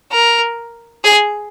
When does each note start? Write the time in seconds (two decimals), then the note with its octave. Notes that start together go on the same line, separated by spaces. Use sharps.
0.12 A#4
1.04 G#4